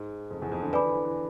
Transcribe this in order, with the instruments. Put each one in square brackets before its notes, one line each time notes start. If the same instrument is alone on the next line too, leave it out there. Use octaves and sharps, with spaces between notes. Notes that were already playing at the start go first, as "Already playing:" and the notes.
Already playing: [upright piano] G#2
F2
E2
F2
D3
[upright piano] D3 [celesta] B4 D5 G#5 B5 D6
[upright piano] E3
E3
E3